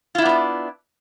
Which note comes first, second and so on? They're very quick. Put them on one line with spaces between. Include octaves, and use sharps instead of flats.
F4 E4 D4 B3 D5